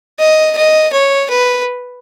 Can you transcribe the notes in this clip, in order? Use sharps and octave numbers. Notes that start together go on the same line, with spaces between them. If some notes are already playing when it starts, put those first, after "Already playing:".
D#5
D#5
C#5
B4